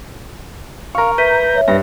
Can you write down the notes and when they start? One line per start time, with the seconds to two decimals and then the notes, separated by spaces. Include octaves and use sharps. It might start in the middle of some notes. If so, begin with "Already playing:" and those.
0.95 A#4 F5 C#6
1.18 B4 E5 A#5 G6 B6 D#7
1.55 C#5 E5
1.68 G2 B4 A#6